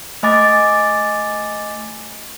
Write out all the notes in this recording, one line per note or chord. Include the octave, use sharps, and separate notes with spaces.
A3 D#5 G#5 D6 A6